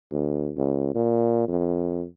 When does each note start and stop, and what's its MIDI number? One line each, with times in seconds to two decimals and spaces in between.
0.12 0.52 38
0.57 0.91 37
0.95 1.47 46
1.48 2.05 41